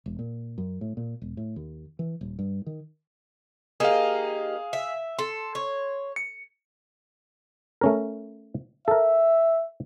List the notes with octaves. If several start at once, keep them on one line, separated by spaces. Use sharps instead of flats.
E1
A#2
F#2
A2
A#2
E1
A2
D#2
E3
D#1
G2
D#3
A#3 D#4 G4 G#4 F5
E5
A4 C6
C#5
C#7
A3 C#4 A#4
A4 A#4 E5